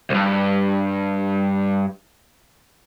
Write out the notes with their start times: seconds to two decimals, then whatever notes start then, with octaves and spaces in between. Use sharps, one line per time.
0.10 C2 G2